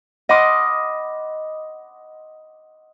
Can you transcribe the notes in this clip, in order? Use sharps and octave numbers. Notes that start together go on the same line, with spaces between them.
D#5 F#5 B5 C6 D6 F6